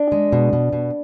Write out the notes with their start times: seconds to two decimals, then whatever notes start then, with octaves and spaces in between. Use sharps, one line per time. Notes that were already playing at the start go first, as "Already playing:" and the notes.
Already playing: D4
0.12 G#3
0.33 B2
0.53 B2
0.73 B2